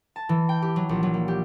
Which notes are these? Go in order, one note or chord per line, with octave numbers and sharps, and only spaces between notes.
A5
E3
G5
G4
F#3
A#1
F#3
A#3
G4